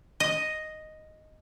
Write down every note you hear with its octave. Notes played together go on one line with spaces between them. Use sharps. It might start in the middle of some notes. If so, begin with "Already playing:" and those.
D#5